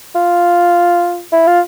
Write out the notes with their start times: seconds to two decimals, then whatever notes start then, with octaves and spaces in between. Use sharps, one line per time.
0.15 F4
1.32 E4
1.47 F4